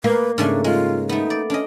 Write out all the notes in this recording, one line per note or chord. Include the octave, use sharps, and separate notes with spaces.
A#3 B4
G#2 C#3 A3 D4
G#3 F4
A3 B3 D#4
D5
C#4 D4 D#5